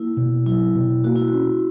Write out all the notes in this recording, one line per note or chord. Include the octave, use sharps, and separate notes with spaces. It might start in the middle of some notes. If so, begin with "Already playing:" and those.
Already playing: A#3 E4
B2
F#3 E4
B2
A#3 F#4
E4
F#4
C#4